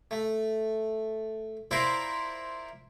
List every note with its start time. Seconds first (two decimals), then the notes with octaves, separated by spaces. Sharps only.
0.11 A3
1.71 E4 F4 A#4 C5 D5 E5